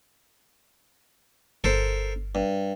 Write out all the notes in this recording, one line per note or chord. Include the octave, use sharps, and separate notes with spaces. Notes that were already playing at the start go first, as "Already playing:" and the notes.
G1 A4 A#4 C5
G2